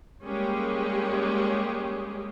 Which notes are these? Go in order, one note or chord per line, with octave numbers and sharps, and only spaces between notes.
G3 G#3 A#3 C#4 G4 G#4